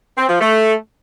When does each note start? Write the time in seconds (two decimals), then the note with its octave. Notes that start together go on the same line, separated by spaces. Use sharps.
0.17 C4
0.29 F3
0.40 A3